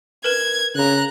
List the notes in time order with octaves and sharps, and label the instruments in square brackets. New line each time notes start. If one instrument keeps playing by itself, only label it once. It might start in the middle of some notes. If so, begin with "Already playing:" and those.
[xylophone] A#4 B4 E7 [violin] G#6
[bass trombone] C#3 [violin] A#5 F#6